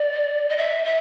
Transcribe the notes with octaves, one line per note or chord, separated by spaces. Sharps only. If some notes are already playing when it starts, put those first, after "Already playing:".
Already playing: D5
D#5
E5
E5